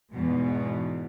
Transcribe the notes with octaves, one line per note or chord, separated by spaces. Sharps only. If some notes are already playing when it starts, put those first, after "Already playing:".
E2 G#2 B2